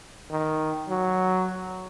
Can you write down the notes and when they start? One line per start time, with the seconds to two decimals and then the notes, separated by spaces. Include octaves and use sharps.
0.31 D#3
0.89 F#3